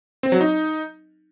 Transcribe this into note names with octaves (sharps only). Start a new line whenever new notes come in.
C4
F#3
D#4